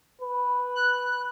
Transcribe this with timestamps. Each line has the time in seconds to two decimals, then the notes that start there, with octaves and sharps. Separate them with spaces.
0.21 B4
0.76 F#6